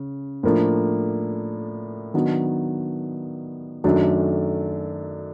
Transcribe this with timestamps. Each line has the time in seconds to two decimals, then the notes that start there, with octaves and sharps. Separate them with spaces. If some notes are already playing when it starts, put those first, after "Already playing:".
Already playing: C#3
0.43 A2 F3 A#3 D4
2.14 D#3 F#3 B3 D4
3.84 F#2 D#3 F#3 A3 D4